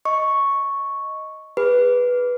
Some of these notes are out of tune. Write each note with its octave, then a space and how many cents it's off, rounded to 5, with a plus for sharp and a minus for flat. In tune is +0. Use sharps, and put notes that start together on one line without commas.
D#5 +5 C#6 +0
G#4 -35 B4 -5